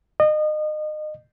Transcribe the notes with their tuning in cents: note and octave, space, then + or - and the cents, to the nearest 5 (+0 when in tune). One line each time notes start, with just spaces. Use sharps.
D#5 -30